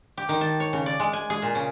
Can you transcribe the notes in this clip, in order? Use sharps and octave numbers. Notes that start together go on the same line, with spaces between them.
G4
D#3
A5
C#5
C#3
D5
G#3
G#5
G#4
A#2
C#3